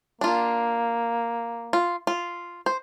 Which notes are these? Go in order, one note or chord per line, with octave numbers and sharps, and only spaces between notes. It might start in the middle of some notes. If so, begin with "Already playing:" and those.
A#3 D4 F4
F4
F4
C5